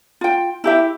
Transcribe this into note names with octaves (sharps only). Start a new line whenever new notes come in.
F4 G5
E4 G4 E5